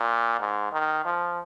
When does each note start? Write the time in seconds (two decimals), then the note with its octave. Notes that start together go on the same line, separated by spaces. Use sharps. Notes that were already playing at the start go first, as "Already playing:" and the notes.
Already playing: A#2
0.40 G#2
0.72 D#3
1.05 F3